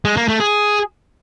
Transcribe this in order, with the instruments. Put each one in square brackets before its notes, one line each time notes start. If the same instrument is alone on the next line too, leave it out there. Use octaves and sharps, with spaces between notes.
[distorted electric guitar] G#3
A#3
A3
G#4